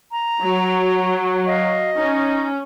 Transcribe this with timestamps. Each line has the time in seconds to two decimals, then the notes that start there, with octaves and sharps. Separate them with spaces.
0.12 A#5
0.41 F#3 F#4
1.47 D#5 F5
1.95 C#4 D#4